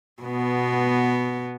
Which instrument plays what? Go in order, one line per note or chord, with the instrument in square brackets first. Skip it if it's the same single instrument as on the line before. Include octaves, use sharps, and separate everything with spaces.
[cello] B2 B3